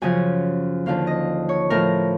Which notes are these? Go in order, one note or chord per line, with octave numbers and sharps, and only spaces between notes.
F#2 C#3 F3 G#5
D#2 D3 F3 F5
D#5
C#5
A2 F3 A#4